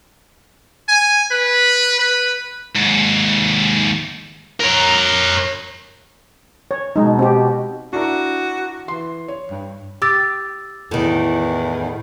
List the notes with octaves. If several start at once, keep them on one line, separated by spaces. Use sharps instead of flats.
G#5
B4
B4
D#2 G#2
A#4 C#5
C#5
B2 G#3 D#4
C4 G4
D4 E4 F#4 A#4
E3 C6
C#5
G2
G4 D6 E6 A6
E2 A2 D#3